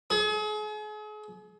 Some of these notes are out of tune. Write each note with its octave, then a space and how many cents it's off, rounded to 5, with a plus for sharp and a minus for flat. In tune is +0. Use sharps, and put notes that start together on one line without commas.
G#4 +40